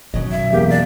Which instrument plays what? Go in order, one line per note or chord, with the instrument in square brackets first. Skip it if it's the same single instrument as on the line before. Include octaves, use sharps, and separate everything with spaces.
[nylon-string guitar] F#2 F#3 D#5 [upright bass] B2 D#3
[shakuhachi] E5
[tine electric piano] E2 A#3 [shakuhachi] G4
[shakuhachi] D5